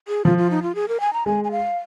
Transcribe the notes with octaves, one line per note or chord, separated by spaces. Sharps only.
G#4
F3 F4
F4
D#4
F4
G#4
A#4
G#5
A#5
G#3 G#5
G#5
F5